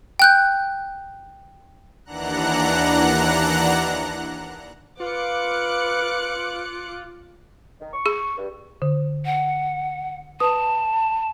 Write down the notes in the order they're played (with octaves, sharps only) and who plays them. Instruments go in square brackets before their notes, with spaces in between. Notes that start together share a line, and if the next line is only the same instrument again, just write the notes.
[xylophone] G5 F#6 G6
[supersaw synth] D#2 E3 D4 F#5 A#5 F#6
[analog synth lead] F4 [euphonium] B4 [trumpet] F5 [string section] D6 F#6 C#7
[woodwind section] D#3
C#6
[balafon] G#4
[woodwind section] G2
[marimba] D3
[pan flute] F#5
[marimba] B4 D#6 [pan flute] A5